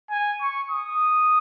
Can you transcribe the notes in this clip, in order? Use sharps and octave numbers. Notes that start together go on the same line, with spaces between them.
G#5
C#6
D#6